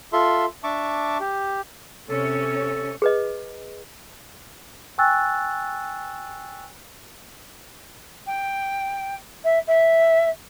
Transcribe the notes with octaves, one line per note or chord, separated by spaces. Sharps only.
F4 A4 E5 C6
D4 E5 A5 C#6 D6
G4
C3 C#4 A4 C#5
G#4 B4 D#5
G5 G#5 C#6 E6 F#6 A6
G5
E5
E5